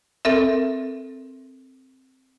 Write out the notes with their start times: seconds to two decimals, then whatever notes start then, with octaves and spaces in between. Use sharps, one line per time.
0.25 C4 A4 A#4 E5